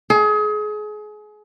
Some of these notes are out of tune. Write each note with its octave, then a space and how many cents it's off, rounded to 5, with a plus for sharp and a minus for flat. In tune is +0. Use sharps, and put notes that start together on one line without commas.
G#4 +30